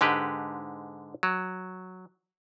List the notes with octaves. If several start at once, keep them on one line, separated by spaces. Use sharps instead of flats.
G#2 D3 G#3 G4 B4
F#3